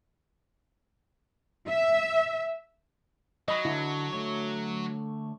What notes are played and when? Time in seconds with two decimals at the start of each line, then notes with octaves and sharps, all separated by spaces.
1.69 E5
3.48 F#3 D#5 B5
3.65 D3 E4
4.13 D3 A3 C#5